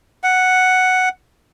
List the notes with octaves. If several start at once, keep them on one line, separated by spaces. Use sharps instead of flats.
F#5